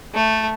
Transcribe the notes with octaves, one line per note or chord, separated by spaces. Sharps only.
A3